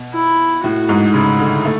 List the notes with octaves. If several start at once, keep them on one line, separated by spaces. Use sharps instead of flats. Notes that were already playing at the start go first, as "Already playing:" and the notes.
Already playing: B2
E4
A2 F#4
G#2
C#3 E4
D3
A3